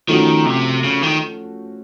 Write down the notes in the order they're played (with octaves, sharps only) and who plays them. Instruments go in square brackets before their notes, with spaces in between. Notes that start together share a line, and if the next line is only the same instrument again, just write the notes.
[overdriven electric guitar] D#3 [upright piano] F3 A3 C#4 F#4
[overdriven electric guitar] C3
C#3
D#3